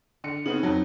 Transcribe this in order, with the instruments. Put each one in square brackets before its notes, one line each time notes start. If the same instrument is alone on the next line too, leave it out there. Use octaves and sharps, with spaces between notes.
[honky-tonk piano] D3 C#7
[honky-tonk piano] C#3 B3 C4 [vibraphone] D#4
[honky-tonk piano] F2 F#3